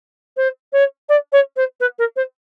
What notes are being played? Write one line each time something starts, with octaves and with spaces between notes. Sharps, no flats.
C5
C#5
D5
C#5
C5
B4
A#4
C5